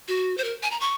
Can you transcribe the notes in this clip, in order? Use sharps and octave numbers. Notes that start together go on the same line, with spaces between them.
F#4
C5
A#4
G#5
A#5
C#6